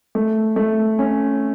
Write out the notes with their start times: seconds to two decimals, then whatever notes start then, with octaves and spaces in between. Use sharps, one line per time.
0.15 A3
0.56 A3
0.99 C#4